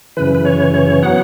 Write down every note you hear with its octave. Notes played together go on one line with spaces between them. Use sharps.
F#2 C#3 E3 B4
B4
C#5
C#5
F#3 B3 F#5